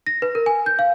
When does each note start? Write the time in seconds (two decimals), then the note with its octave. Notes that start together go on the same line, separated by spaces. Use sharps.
0.06 A#6
0.22 B4
0.35 A#4
0.46 G#5
0.66 G6
0.79 F5